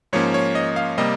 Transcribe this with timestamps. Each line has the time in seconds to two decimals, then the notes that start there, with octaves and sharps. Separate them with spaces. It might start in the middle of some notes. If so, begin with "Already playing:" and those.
0.13 G#2 F3 A#3 C#4 C#5
0.34 C#5
0.55 D#5
0.76 F5
0.98 C3 G3 A#3 D#5